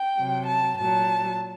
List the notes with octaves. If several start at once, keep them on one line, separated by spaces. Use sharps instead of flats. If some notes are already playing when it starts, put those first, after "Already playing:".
Already playing: G5
C3 F#3
A5
A#2 F#3 A5